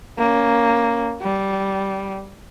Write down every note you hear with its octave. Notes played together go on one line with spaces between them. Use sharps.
A#3 C#4
G3